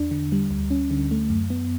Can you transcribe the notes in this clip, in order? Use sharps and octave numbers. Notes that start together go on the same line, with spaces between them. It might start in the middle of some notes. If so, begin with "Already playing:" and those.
Already playing: E2 D4
D3
G3
D2
C#4
D3
A3
F#2
B3